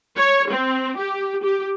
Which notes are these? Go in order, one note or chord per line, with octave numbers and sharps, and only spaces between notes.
C#5
C4
G4
G4